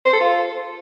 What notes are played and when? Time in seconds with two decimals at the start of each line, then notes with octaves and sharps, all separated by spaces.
0.05 C5
0.13 A4
0.20 F4